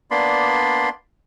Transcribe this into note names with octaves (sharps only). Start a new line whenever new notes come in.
A#3 B3 D4 D5 B5 C6